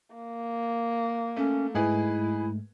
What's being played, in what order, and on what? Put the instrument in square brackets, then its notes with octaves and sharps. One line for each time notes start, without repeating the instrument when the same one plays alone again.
[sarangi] A#3
[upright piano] A3 [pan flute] C#4
[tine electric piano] G#2 G#3 A3 [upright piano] D#4 G#4 B4 [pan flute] E4